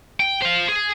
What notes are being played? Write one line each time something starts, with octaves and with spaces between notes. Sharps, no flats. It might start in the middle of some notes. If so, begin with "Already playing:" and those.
G5
C5 F5
G#4